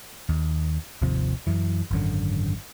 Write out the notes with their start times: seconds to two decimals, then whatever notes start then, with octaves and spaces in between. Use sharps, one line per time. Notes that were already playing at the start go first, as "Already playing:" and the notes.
0.29 D#2
1.02 G#1 D#2 C3 F3
1.47 F#2 E3
1.91 G#1 F#2 D3